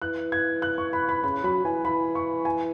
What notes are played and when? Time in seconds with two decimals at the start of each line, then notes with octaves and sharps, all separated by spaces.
0.02 E3 F#6
0.32 G#6
0.62 F#6
0.78 C#6
0.93 B5
1.09 B5
1.24 C#3 B5
1.44 F#3 B5
1.64 E3 G#5
1.85 E3 B5
2.15 C#6
2.45 G#5